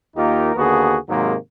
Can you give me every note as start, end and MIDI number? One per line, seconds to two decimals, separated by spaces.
0.17 0.52 39
0.17 0.52 58
0.17 0.52 63
0.17 0.52 65
0.17 0.52 67
0.17 0.52 70
0.56 0.98 39
0.56 0.98 50
0.56 0.98 58
0.56 0.98 59
0.56 0.98 66
0.56 0.98 68
1.09 1.35 44
1.09 1.35 48
1.09 1.35 51
1.09 1.35 54
1.09 1.35 56
1.09 1.35 58